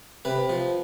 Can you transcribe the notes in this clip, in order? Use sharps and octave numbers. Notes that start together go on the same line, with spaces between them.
C3 B4
F3